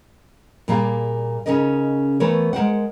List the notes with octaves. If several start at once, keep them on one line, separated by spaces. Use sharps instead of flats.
A#2 G3 A#3 G#4 F5
C#3 C#4 D#4 A#4 D#5
E3 A3 B3 A#4 C#5
G#3 A#4 C5 F#5